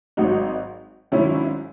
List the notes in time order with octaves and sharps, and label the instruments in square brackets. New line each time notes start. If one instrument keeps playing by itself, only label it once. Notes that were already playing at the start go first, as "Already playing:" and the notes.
[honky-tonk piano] G#1 G#2 F#3 D#4 F#4
G#1 G#2 D#3 F#3 C#4 E4